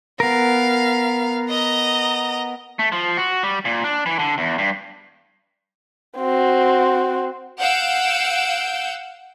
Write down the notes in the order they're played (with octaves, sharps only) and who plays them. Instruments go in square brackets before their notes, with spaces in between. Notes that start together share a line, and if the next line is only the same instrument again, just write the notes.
[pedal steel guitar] B3 A#4 [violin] F5
[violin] D#5 A#5
[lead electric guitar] A3
F3
F#4
G3
A#2
D4
E3
D3
E2
G2
[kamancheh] C4 F#4
[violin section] F5 F#5 E6 G6 D7